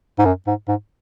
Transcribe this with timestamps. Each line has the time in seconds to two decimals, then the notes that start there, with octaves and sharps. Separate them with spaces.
0.19 G#2
0.25 F#2
0.47 G#2
0.68 G#2